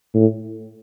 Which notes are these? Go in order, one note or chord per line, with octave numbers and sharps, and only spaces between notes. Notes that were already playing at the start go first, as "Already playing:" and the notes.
A2